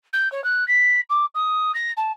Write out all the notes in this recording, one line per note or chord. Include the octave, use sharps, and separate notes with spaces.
G6
C#5
F#6
B6
D6
D#6
A#6
A5